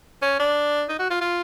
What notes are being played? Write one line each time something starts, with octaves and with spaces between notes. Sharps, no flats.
C#4
D4
D#4
F#4
F4
F4